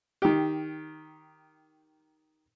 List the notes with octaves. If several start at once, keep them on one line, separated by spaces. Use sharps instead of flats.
D#3 G4